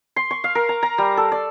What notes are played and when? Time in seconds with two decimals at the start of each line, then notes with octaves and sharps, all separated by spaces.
0.16 C6
0.31 C#6
0.44 F5
0.55 A#4
0.69 A#5
0.83 A#5
0.98 G3
1.17 A4
1.32 D5